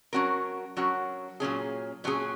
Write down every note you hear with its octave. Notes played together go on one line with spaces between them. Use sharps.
F#3 C#4 F#4 A#4
F#3 C#4 F#4 A#4
A#2 F#3 C#4 G#4
A#2 F#3 C#4 G#4